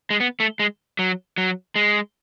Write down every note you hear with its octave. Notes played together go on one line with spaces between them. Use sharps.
G#3
B3
A3
G#3
F#3
F#3
G#3